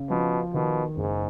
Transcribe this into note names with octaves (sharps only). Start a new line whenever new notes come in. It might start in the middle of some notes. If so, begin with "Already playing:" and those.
Already playing: C#3
B2 F3
B2 D#3
F#1 G#2